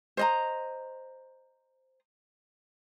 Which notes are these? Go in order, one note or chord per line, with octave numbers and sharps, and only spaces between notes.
C5 D#5 A#5